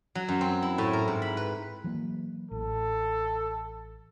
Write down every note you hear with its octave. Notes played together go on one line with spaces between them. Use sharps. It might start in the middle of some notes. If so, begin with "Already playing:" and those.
F#3
F#2
C4
E4
A2
A#4
G#2
B5
B4
E3 F#3 A#3
A1 A4